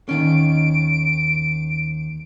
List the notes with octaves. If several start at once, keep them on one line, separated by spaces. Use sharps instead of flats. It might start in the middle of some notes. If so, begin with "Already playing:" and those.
D#2 D#3 C#4 D7